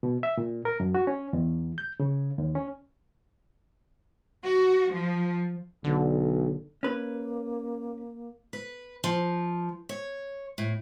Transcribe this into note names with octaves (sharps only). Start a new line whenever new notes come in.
B2
E5
A#2
A#4
F#2
F#4
C#4
E2
G6
C#3
D#2
C#4
F#4
F3
B1 D3
A#3 C#4 B4
B4
F3
C#5
A2